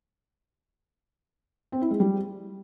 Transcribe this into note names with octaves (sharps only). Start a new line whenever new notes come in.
C4
E4
G#3
G3